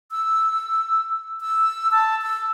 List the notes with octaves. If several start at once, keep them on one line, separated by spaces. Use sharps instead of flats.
E6
E6
A5
E6